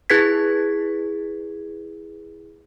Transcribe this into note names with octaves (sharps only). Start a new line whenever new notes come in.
E4 G#4 B4 G#6 B6